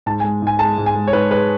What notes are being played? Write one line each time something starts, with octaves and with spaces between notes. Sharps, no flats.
G#2 A5
G#5
G#3
G#2 G#5
G#3 A5
G#2
G#5
G#3
C#5
G#2 B4
G#3 B4